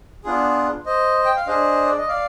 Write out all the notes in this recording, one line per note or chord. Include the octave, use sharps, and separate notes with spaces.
B3 D4 F4 G#4
C5 D#5
G5
F5
D4 G#4 C5 D#5
D5
D#5
D5 F5